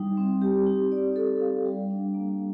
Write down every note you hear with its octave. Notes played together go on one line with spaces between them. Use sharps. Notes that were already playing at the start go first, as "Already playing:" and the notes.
Already playing: G3 D#4
C4
G4
D#4
D5
A4
F5
G3
D4
A#3